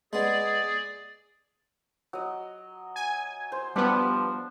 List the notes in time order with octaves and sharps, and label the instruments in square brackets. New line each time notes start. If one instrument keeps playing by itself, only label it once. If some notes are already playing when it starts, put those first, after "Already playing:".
[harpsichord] G#3 B3 [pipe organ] G#4 D5
[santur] F#3 D#5
[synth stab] G#5
[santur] C5
[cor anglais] F3 [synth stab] G3 B3 [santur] D4